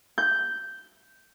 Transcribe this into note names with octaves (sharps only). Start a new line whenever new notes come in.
G6